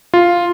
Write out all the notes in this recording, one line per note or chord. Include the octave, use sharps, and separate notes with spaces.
F4